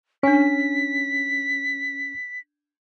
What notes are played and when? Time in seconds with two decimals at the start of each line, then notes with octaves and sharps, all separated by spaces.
0.23 C#4 D4 G#5 B6